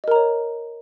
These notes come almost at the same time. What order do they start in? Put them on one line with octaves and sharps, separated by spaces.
D#5 A#4 A#5 C#5